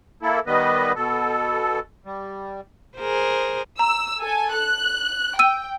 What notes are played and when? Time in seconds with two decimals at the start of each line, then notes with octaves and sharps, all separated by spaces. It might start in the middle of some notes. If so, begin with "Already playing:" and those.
0.22 A#3 E4 A4
0.47 D#3 G3 B3 B4 D#5
0.96 B2 A4
2.05 G3
2.98 G#4 A#4 C5
3.79 A#5 E6
4.21 A4 G#5
4.54 F#6
5.39 G5 E6 D#7